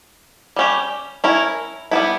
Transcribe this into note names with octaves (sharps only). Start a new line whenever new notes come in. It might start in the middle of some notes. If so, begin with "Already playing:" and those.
G3 C#4 G4
C#4 E4 A#4
G3 B3 E4